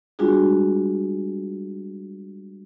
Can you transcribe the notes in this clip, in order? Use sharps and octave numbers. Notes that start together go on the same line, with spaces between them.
G3 G#3 D4 F4 F#4 G#4